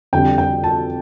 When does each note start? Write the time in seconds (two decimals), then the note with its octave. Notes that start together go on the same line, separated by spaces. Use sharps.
0.13 F2 D3 G3 G5
0.38 G5
0.64 A5